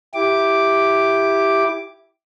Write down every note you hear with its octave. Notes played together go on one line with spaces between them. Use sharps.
E4 G4 D6